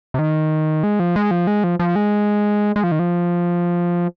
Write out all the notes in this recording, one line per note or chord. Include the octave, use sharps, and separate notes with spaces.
C3
D#3
G#3
F3
G#3
F3
G#3
F3
F3
G#3
G#3
F3
D#3
F3